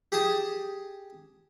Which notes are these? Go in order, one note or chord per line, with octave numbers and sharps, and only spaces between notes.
G4 G#4 G#5 A5 D#6